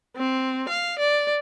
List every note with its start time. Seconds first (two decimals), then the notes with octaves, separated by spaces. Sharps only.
0.17 C4
0.69 F5
0.99 D5